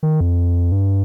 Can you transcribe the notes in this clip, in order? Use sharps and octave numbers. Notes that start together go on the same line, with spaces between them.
D#3
F2
G2